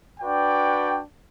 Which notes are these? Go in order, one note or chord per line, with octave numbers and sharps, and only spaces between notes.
D4 F#4 B4 D5 G5